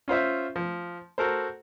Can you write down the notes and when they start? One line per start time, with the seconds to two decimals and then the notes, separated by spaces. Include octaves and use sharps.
0.08 C#4 F4 C5 E5
0.56 F3
1.18 F#4 A4 A#4 C5